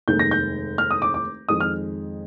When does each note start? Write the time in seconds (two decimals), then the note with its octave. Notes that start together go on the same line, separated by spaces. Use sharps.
0.08 F1 D#2 D#3 G#3 G6
0.19 A#6
0.31 G6
0.78 F6
0.91 D#6
1.02 D6
1.14 D6
1.49 F2 D#3 G#3 D#6
1.61 F6